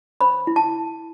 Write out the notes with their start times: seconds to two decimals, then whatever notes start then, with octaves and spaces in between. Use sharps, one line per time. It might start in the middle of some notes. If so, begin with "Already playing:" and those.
0.21 C5 B5
0.47 E4
0.56 A5